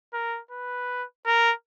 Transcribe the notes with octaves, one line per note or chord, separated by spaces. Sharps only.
A#4
B4
A#4